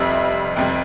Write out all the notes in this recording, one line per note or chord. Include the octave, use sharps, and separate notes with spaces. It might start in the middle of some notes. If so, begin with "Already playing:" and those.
Already playing: F1 F2 C3 G3 E5
F1 F2 C3 G3 G5